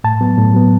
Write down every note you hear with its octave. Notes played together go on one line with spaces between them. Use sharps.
A2 A5
F#3 B3
A2
F#3 B3